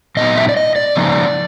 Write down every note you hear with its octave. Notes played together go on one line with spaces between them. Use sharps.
A#2 F#3 B3 D#4 D#5
E5
D5
D#5
D5
C#3 F3 A#3 D#4